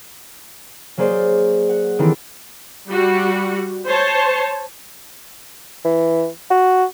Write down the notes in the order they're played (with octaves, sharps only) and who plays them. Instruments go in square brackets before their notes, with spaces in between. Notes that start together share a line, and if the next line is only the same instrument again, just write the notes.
[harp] F#3 A#3 G#4 C5 D5
F#5
D#3 E3 C4 E4 G4 A4
[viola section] G3 F#4
C5 C#5 A5
[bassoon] E3
F#4